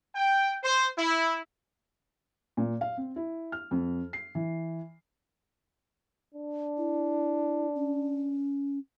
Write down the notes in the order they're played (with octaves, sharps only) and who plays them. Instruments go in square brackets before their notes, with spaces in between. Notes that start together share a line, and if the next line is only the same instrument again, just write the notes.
[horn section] G5
C5
E4
[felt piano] A#2
F5
C4
E4
F6
F2
C7
E3
[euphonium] D4
[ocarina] E4
C#4